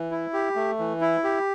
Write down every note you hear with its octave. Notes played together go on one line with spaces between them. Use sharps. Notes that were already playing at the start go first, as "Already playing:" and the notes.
Already playing: E3
E4
G4
A3
E3
E4
G4